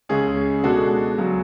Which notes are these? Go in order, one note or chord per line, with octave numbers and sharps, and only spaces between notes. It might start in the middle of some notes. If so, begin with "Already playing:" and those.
C#2 C#3 G#3 C#4 G#4
B2 G#3 D4 F#4 A4
C#2 C#3 F#3